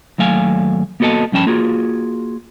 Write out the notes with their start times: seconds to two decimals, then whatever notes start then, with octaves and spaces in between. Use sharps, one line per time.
0.18 D#2 F#3 A3 F5 G#5
1.00 A#3 B3 F#4 A4 D#5 A5
1.32 G2 F3 C#4 G5 A5 B5
1.46 A#3 F4 F#4 G#4